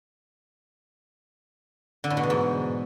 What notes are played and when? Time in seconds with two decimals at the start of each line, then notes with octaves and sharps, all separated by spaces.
2.04 D3
2.10 A2
2.17 B2
2.23 E2
2.30 G#2